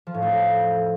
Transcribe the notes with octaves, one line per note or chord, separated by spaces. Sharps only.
F3
A2
A3